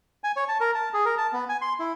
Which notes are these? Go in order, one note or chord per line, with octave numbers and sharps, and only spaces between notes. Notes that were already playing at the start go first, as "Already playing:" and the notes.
G#5
C#5
A5
A#4
A5
G#4
A#4
A5
B3
G#5
C6
E4